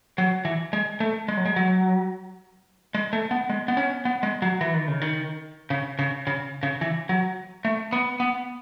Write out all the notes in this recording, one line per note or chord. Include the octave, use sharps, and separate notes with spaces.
F#3
E3
G#3
A3
G#3
F#3
G#3
F#3
G#3
A3
B3
G#3
B3
C#4
B3
G#3
F#3
E3
D#3
C#3
D#3
C#3
C#3
C#3
C#3
E3
F#3
A3
B3
B3